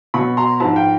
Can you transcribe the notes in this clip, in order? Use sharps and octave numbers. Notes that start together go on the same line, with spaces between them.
B2 F#3 B5 C#6
A#5 C6
G#2 F3 A5 B5
F5 G5